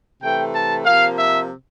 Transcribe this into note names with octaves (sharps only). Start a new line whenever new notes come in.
C3 E3 A3 G5
A5
C3 F3 A#3 F5
E5